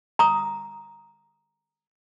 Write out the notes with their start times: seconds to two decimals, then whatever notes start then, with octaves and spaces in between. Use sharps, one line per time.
0.19 A#5 D#6